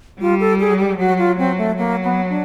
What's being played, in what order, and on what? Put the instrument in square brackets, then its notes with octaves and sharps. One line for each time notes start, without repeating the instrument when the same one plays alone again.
[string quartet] G3 [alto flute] F4
[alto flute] A4
G#4
G4
[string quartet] F#3 [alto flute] F#4
[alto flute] F4
[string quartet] F#3 [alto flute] C4
[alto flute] A3
[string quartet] F#3 [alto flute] A#3
[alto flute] B3
D4